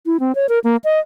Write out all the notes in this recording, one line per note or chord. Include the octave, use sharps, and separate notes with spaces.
E4
C4
C#5
A#4
A#3
D#5